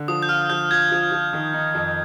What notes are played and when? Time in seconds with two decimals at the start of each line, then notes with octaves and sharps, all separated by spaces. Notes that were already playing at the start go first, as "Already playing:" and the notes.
Already playing: D3
0.08 F3 D#6
0.22 G6
0.29 F4 F6
0.50 F3 G6
0.71 F4 G#6
0.91 F3
1.12 F3
1.33 D#3
1.53 D#4
1.74 F2